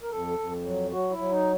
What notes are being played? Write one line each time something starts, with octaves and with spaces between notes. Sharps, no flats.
A#4
F2 A4
F2
F#3
F#3 F#4
E4
F#3
D#4